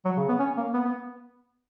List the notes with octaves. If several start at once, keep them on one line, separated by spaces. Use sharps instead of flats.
F#3
C#3
B3
C#4
A#3
B3
B3